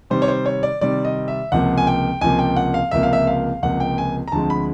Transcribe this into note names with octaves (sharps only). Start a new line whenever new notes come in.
C3 D#3 G3 C4 C5
C#5
C5
C#5
D5
C3 D#3 G3 C4 D5
D#5
E5
C#2 C3 F3 A#3 F#5
G#5
G5
C#2 C3 F3 A#3 G#5
G5
F#5
F5
C#2 C3 F3 A#3 E5
F5
E5
F5
C#2 C3 F3 A#3 F#5
G5
G#5
A#5
D2 D3 F3 G#3 C4 A5
B5